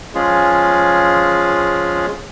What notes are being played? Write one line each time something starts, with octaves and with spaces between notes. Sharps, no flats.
F3 G#3 C#4 F4 G#4